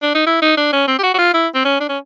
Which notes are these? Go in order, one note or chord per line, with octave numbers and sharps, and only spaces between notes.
D4
D#4
E4
D#4
D4
C#4
C4
G4
F#4
F#4
F4
E4
C4
C#4
D4
C#4